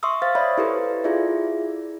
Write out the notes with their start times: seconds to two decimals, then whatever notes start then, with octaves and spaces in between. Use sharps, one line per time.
0.03 E5 C6 C#6 D#6 E6
0.22 C5 F5 F6 A6
0.35 C#5 D5 E5 F5 B5 C6
0.58 E4 G4 A4 B4 C6
1.04 E4 F4 G#4 D5 E5